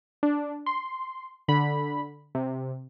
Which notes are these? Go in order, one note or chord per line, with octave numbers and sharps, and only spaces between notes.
D4
C6
D3 B5
C3